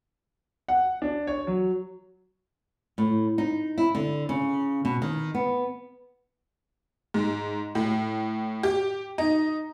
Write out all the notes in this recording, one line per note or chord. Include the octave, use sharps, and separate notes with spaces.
F#5
D4
C#5
F#3
A2
D#4
E4
D3
C#3
B2
D#3
B3
G#2
A2
G4
D#4